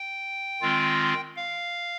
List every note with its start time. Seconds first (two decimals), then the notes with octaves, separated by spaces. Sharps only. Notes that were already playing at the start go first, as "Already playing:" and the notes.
Already playing: G5
0.61 D#3 G#3 C4 F4
1.36 F5